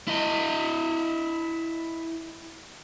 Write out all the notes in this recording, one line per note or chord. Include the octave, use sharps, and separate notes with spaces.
E4 D#5